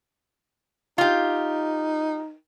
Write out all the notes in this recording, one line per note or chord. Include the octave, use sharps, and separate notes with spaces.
D#4 F4 G4